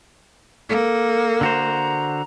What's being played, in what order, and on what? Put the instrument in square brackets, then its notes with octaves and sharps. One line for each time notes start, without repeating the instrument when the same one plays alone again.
[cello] A#3 [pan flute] A4
[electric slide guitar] D3 F#4 C5 [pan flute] A#5